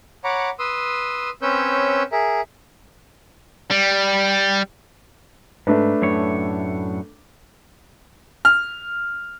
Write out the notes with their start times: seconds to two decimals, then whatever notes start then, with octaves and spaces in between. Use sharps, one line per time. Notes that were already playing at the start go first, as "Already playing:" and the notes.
0.24 C#5 F#5 A#5 B5 D6
0.59 B4 C6 D#6 E6
1.42 C4 C#4 B4 C#5 E6 G6
2.12 G#4 A#4 E5
3.71 G3
5.67 G#2 A3 D4 B4
6.02 F#2 A2 C#5
8.45 F6